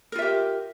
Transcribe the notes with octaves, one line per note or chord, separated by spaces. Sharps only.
F4 G4 A#4 E5